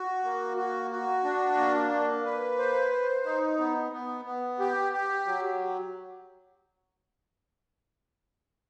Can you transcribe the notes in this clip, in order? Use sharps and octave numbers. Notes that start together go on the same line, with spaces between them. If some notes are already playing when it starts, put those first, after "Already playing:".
Already playing: F#4
A#3
F#4
F#4
D4
A#3
A#3
B4
C5
C5
D#4
B3
B3
B3
G4
G4
F#3